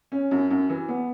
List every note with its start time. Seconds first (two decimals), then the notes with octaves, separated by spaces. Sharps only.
0.12 C#4
0.31 F#2
0.51 F#2
0.69 E3
0.88 B3